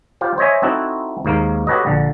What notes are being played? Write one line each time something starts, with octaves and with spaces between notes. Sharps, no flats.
F4 G4 C5
C5 C#5 D#5 E5 G#5
C4 D#4 E4 F#4 A4
D#2 G#2 A#3 F5
F#4 G4 A4 B4 C#5 D#5
A#1 D3